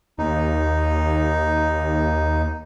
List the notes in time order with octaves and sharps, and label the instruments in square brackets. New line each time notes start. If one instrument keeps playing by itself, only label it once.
[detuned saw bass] D#2 [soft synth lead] A#3 [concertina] D#4